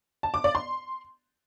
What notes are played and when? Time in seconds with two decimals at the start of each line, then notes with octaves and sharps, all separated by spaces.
0.23 A5
0.34 D6
0.44 D5
0.55 C6